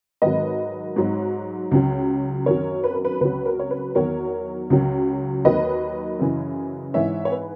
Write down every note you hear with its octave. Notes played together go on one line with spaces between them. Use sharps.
G#2 D#3 F#3 B4 D#5
G#2 F#3
C#2 C#3 F#3
F#2 D#3 F#3 A#4 C#5
B4
A#4
B4
C#2 C#3 F#3 B4
A#4
C#5
B4
E2 D#3 F#3 A#4 C#5
C#2 C#3 F#3
D#2 D#3 F#3 B4 D#5
F#2 C#3 E3
G#2 E3 C#5 E5
C#5
B4